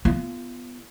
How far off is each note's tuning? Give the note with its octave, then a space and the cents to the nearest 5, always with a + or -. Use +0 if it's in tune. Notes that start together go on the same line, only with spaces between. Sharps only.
B3 +5 F4 -20